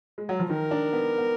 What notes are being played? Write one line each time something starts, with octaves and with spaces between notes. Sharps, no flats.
G#3
F#3
F3
D#3 A#4
D4
B3
B3